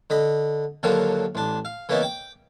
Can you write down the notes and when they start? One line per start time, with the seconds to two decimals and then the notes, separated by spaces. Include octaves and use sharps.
0.10 D3 D#5 B5
0.83 D#2 D3 F3 F#3 A#4 F5
1.35 A1 D4
1.65 F5
1.89 C#3 E3 A#3 B3 C#4 D#4
2.02 G5 D6